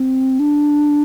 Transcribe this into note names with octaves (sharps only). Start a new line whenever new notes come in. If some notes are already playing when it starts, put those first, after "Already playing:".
Already playing: C4
D4